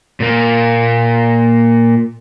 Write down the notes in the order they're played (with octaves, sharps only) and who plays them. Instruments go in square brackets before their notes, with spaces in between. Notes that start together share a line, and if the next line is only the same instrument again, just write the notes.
[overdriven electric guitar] A#2 A#3